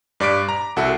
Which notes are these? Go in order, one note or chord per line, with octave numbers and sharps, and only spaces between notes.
G2 D5 D6 B6 D7
A#5
C2 F#4 A4 E5